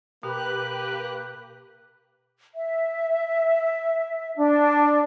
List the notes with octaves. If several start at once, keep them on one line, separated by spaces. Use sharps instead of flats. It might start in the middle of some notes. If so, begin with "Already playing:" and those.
B2 A#3 G4 B4 F#6
E5
D4